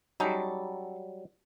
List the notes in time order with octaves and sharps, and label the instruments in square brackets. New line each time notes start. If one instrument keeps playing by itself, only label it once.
[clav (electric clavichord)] F#3 G3 [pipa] C#4 D#4 A4